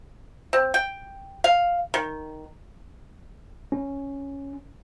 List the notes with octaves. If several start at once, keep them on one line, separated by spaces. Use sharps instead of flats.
C4
G5
F5
D#3
C#4